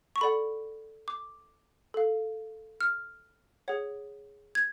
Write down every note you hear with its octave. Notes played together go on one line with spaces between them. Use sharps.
C#6
A4 D5 F#5 B5
D6
A4 F5
F6
G#4 C#5 F#5
G#6